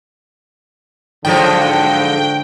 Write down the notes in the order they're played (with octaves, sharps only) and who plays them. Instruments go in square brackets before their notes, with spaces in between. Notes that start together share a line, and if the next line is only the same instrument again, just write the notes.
[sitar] G#2 F3 F#3 [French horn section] D3 [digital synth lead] G5